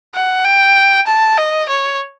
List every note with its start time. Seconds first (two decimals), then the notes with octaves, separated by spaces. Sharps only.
0.14 F#5
0.44 G5
1.07 A5
1.38 D#5
1.69 C#5